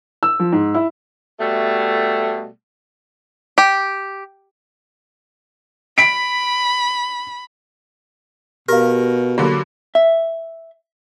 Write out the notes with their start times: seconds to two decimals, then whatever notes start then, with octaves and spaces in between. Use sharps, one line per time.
0.23 E6
0.40 F3
0.52 G#2
0.75 E4
1.40 B2 G3 A3
3.58 G4
5.98 B5 B6 D7
8.69 B2 G4 A#4 F5
9.38 D3 F#3 A#3 F4 G4
9.95 E5